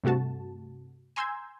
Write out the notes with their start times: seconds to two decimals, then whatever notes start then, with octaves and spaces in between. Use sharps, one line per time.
0.04 G2 C3 A3 F#4 A5
1.16 G#5 A#5 C6 E6 G6 G#6